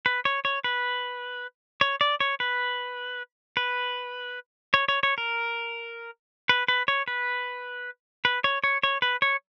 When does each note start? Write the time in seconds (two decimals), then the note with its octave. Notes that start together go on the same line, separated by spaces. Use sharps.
0.06 B4
0.25 C#5
0.45 C#5
0.64 B4
1.81 C#5
2.01 D5
2.20 C#5
2.40 B4
3.57 B4
4.74 C#5
4.89 C#5
5.03 C#5
5.18 A#4
6.49 B4
6.68 B4
6.88 C#5
7.08 B4
8.25 B4
8.44 C#5
8.64 C#5
8.83 C#5
9.02 B4
9.22 C#5